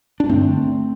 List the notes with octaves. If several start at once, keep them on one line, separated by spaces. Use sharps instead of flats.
D4
G2 D3 A3 C4